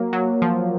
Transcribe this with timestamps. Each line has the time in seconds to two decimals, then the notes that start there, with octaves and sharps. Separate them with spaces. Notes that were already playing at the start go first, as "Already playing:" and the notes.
Already playing: F#3 A#3
0.13 F#3
0.42 F3